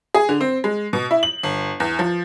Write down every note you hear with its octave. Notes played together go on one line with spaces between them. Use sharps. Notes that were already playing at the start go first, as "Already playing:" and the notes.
G#4
D3
C4
G#3
B2
E4
F#7
G1
E2
F3